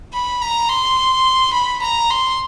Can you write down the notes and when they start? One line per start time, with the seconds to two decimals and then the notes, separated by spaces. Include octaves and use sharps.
0.13 B5
0.41 A#5
0.69 C6
1.53 B5
1.81 A#5
2.10 C6